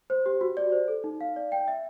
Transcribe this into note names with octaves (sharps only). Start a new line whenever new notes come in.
C5
G4
F#4
D5
C5
A4
D#4
F5
D5
G5
E5